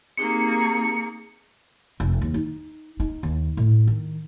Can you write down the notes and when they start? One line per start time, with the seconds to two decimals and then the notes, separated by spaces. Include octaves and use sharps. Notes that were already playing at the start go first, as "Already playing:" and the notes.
0.17 A#3 C4 D#4 G4 G#4 C#7
2.00 F1
2.21 D#2
2.34 D#4
3.00 D#4
3.23 D#2
3.57 A2
3.87 D#3